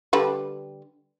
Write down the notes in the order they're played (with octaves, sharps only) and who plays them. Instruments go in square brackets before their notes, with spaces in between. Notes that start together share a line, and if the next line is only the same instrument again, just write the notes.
[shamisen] D3 G3 B4